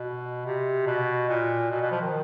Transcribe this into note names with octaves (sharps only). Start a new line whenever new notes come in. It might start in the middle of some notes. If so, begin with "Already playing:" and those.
Already playing: B2
C3
B2
A#2
B2
B2
F3
D#3